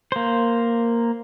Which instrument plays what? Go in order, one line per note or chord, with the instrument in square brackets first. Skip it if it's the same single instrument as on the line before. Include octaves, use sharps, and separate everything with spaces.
[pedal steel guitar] A#3 C5